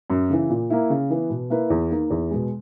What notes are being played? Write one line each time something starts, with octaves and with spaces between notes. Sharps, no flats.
F#2
C#3 E3
A#2
A#3 E4
C#3
E3 B3
B2
A#3 E4 B4
E2
D#3 A#3
E2
B2 G#3